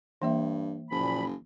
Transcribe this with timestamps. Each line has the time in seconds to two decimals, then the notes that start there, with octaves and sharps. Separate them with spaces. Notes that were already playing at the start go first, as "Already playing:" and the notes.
0.22 G2 E3 A#3 E5
0.90 F#1 A#2 F3 B5